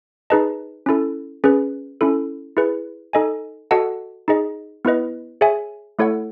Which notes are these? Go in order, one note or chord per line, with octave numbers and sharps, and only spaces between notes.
D#4 G#4 B4 D#5 A5
C#4 E4 A4
C#4 G#4 B4
C#4 E4 A4
E4 G#4 B4
D#4 A4 D#5 G#5
F#4 A4 D#5 F#5 A5
D#4 G#4 D#5
B3 E4 B4 D#5
G#4 C#5 E5 G#5
A3 E4 A4 C#5 F#5